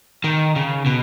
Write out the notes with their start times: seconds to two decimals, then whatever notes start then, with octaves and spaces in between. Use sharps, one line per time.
0.24 D#3
0.56 C#3
0.86 B2